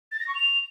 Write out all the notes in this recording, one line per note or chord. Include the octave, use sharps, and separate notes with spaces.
A6
A#6
C#6
F7